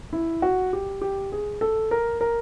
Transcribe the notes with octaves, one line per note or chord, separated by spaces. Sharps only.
E4
F#4
G4
G4
G#4
A4
A#4
A#4